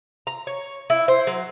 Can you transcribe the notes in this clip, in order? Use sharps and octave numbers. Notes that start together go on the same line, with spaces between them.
A#5
C#5
E4
C5
F#3